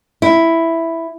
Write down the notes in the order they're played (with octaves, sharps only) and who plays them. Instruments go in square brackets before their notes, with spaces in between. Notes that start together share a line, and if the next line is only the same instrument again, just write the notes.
[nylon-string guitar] E4